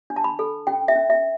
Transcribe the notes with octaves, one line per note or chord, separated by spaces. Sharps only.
D4
A5
B5
A4
C#4 G5
E5
C#4
E5